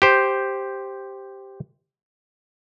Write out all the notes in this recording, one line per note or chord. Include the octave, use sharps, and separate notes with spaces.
G4 C5